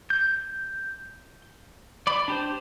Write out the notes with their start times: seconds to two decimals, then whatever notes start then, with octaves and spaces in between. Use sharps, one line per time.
0.10 G6
2.07 D5 B5
2.28 D4 G4 C5